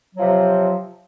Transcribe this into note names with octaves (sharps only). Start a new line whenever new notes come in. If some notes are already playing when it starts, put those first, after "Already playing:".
C3 F3 F#3